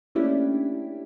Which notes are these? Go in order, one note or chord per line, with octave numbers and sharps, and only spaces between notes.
A3 A#3 C#4 D4 E4 G4